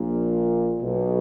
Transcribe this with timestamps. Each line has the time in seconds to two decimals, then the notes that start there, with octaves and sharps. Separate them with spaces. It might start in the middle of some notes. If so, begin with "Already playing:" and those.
Already playing: A#1 A#2
0.82 B1 B2